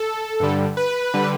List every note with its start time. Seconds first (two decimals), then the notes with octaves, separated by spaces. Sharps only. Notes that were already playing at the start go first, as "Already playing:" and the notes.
Already playing: A4
0.40 G2 D3 G3
0.77 B4
1.14 D3 G3